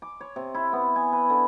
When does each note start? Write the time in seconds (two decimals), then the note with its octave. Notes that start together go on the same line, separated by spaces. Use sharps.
0.02 D6
0.21 C#5
0.36 C3
0.54 E4
0.73 B3
0.96 G#5
1.13 B4
1.30 D3